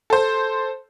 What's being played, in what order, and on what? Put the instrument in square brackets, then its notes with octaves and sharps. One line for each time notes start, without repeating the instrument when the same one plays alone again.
[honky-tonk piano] A4 C5